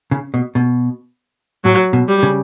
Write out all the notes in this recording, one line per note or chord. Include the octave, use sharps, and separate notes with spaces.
C#3
B2
B2
A2 F#3
B2
G3
C#3